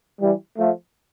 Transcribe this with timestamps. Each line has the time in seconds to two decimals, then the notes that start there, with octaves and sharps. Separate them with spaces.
0.21 E3 G3
0.58 F3 A3